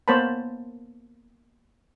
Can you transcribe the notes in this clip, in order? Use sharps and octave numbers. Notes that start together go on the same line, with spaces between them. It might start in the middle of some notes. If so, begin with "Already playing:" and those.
A#3 B3 C5 C#5 A5 B5